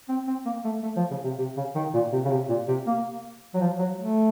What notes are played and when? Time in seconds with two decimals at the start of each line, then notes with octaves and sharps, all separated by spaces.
0.09 C4
0.27 C4
0.45 A#3
0.64 A3
0.83 A3
0.96 F3
1.11 C#3
1.24 C3
1.38 C3
1.57 C#3
1.75 D#3
1.94 A#2
2.12 C3
2.24 C#3
2.31 C3
2.49 A#2
2.68 C3
2.87 A#3
3.54 F#3
3.61 F3
3.79 F#3
3.98 A3